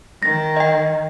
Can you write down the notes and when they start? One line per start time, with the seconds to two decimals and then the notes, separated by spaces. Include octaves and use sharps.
0.23 D#3 A#6
0.57 D#5 G5